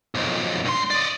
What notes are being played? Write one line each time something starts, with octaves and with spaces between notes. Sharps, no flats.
B1 F2
G2 C6
D5 D#5